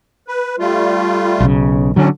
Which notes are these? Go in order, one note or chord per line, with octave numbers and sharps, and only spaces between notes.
B4
G3 A3 F4
B1 C#3
A2 D3 F#3 C#4